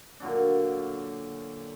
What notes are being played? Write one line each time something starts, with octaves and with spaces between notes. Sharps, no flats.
A#2 D3 F#3 D4